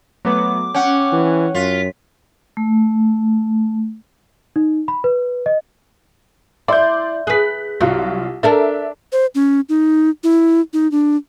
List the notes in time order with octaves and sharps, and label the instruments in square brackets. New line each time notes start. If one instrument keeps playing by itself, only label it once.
[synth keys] F#3 A3 B3 [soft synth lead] D6
[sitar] C#4 [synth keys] F#5 G5
[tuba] E3
[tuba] F#2 [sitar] F4 [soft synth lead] B6
[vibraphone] A3
[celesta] D#4
B5
B4
D#5
[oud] E4 [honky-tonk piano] D5 C6 G6
[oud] G#4 B4 [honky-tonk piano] F#6 B6
[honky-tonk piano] C2 F4 [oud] F#3
[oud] D4 A4 A#4 [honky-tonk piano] E5
[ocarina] C5
C#4
D#4
E4
D#4
D4